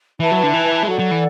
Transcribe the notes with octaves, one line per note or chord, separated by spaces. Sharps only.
E3 E4 B4 E5 A5
F#3
D3
E3
G#3
F#3 A4 D5 F#5
F#3
E3